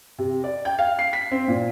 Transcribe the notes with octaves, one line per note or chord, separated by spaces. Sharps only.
C3
D5
G5
F5
C7
B6
C4
A#2